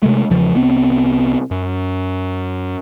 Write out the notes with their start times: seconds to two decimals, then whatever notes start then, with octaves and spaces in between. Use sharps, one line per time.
0.03 C3 G#3 A3
0.30 E2 C#3 F3
0.55 C2 B3 C4
1.51 F#2